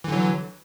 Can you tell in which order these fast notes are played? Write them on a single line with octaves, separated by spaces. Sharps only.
E3 D3 F#3